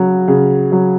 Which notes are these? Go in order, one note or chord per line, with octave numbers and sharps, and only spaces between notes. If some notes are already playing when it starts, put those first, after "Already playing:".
Already playing: C#3 F#3
C#3
F#3